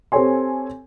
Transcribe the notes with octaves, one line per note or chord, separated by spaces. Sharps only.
C4 G4 A4 C#5 G#5 C6